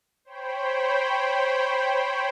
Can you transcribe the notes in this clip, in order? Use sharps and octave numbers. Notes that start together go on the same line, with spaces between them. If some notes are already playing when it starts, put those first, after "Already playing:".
C5 C#5 G5 B5